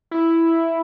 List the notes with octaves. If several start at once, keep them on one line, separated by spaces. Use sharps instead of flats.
E4